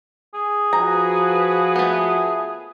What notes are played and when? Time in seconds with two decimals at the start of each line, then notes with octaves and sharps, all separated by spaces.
0.34 G#4
0.73 F3 F#4 B4 A#5
1.76 A3 B3